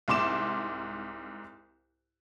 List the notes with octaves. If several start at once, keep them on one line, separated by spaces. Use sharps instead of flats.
C2 G#2 C6 D6 E7